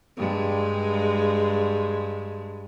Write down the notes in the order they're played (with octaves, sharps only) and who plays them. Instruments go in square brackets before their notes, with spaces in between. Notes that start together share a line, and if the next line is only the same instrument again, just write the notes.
[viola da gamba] G2 G#3